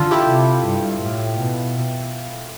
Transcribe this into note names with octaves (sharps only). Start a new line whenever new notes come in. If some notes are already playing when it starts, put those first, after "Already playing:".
Already playing: D3 F4 A4
E4 G4
C3
G2
A2
B2